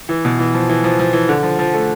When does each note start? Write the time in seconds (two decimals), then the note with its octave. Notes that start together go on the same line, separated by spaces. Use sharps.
0.09 E3
0.25 B2
0.39 E3
0.54 F3
0.70 E3
0.84 F3
0.99 F3
1.13 E3
1.29 D3
1.43 F3
1.59 F3
1.74 A3